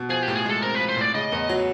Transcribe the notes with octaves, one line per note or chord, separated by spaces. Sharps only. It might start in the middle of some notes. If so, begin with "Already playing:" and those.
Already playing: B2
F3 G#4
G4
A2
G#4
G#3 A4
C4 A#4
B4
F3
C5
A2 D5
C#3 D#5
E2
F#3